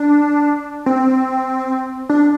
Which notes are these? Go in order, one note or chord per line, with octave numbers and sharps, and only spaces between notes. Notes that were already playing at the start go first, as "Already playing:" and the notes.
Already playing: D4
C4
D4